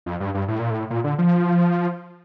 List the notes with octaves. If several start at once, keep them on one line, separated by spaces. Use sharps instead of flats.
F2
G2
G2
A2
A#2
A2
A#2
D3
F3